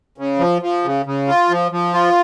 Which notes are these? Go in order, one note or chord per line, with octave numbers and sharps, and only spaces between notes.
C#3
F3
F3
C#3
C#3
F4
F3
F3
F4